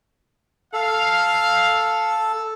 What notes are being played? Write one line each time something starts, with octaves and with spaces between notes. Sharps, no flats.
A4 F5